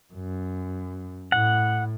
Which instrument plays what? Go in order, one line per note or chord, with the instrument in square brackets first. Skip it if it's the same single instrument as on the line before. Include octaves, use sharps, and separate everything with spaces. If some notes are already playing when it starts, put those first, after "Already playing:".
[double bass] F#2
[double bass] A2 [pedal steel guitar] F#5